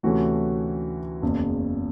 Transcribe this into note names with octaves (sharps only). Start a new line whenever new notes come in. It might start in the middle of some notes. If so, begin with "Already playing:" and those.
D2 C3 E3 A3 C#4 F#4
F#1 E2 C#3